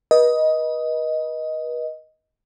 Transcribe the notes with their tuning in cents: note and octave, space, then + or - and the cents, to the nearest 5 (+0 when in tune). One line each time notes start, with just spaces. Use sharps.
B4 -35 D#5 +10